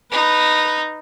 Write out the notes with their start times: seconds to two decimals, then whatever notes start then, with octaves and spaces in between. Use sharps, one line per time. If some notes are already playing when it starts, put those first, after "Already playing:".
0.12 D#4 B4